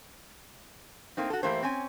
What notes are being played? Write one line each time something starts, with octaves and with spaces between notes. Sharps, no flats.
A3 A#3 C4 D#4
F#4 A4
E3 A3 A#3 E4 G4 C5
C4 C#4 G#5